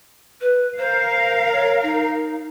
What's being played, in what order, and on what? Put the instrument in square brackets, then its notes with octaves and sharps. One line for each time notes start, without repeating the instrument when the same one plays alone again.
[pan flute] B4
[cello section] A#4 F5 [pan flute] C5
[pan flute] C#5
D#4